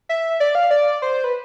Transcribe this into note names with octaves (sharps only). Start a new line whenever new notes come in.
E5
D5
F5
D5
C5
B4